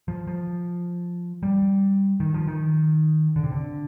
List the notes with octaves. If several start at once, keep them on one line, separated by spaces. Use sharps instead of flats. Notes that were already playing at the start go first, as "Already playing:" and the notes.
F3
F3
G3
D#3
F3
D#3
D3
C3
D3